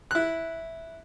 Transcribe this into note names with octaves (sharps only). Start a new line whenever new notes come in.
E4 F#6